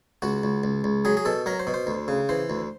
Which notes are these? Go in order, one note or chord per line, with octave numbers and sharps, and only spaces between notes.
C#2 F#4
C#2
C#2
C#2
F#3 G#4
G#4
B2 A4
F#3 A#4
C5
B2
C5
D2
C#3
E3 C5
D2